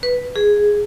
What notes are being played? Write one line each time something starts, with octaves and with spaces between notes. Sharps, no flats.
B4
G#4